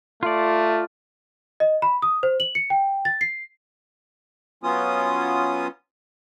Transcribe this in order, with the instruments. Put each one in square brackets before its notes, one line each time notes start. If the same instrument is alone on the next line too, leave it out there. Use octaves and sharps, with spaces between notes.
[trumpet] A3 [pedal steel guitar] F4 D5
[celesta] D#5
B5
D#6
C5
F#7
C#7
G5
A6
C7
[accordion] F#3 B3 C#4 F4 D#6